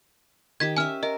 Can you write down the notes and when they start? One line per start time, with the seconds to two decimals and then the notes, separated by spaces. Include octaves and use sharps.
0.60 D#3 G4 G#6 B6
0.77 C#4 E5 G#5 F6
1.03 A#4 D#5